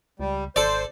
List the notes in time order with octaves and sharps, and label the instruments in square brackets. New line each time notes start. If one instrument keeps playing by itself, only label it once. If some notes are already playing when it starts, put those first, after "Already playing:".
[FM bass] C#2 [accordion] G3
[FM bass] G#1 [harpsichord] A4 D5 [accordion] C5